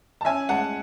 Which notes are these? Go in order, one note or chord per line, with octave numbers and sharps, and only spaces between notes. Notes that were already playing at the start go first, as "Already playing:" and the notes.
A5
C#4 E5 G#5
G#3 F#5 A5